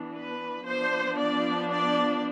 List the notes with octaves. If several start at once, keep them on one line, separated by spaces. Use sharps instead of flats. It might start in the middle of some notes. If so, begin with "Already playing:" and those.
Already playing: E3 B3 D4
B4
F3 B3 D4 C5
D5
D5